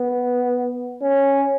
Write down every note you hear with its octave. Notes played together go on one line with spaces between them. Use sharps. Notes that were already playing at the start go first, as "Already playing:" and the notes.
Already playing: B3
C#4